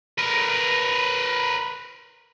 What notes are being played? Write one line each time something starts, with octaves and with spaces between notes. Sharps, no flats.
A#4 B4